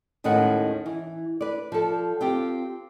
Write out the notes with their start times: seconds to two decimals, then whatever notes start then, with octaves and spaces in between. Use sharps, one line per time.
0.24 D#2 A2 D#3 G#3 C#4 F#5
0.86 E3
1.41 B4 D5
1.72 F3 A4
2.21 C4 F4 G4